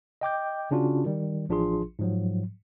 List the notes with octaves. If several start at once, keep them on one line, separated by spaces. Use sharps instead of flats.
D#5 G5 D6 G6
C#3 C#4 D4 F4 F#4
D#3 G3
A1 F3 D4 F4 G#4 C6
G#2 F3 F#3